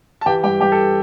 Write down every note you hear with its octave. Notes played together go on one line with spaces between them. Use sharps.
A5
E3 G4 G5
G2 G4 G5
G2 G4 G5
A4